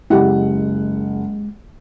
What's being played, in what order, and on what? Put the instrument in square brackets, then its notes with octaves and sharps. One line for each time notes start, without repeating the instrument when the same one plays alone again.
[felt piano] F#1 F#5 [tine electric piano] G#3 [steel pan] E4 G4